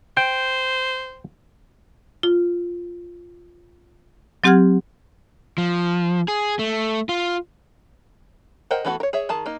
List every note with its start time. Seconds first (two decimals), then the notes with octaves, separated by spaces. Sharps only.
0.17 C5 G5
2.23 F4
4.44 F#3 C4 G4 F#5 F6 G#6
5.58 F3
6.28 G#4
6.59 A3
7.09 F4
8.71 A#4 C5 D#5 F#5 G5
8.85 E3 A3 B3 F#4 A4
9.00 A#4 C#5
9.13 G#4 C#5 E5
9.29 D#3 G#4 A5
9.46 A#3 D#4